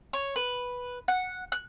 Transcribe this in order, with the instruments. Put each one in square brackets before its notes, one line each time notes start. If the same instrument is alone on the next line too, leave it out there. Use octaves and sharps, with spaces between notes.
[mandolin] C#5
B4
F#5
F#6